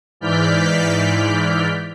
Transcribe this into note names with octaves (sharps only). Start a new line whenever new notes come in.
G#2 E3 D5 F6 G6 B6